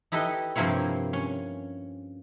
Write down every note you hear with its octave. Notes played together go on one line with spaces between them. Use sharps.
D#4 E4 G4 A4 B4 D#5
G2 C3 F3 A#3 E4 C#5
C#4